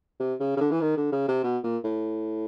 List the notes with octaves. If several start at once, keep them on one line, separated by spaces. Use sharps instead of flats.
C3
C#3
C#3
D3
E3
D#3
D3
C#3
C3
B2
A#2
A2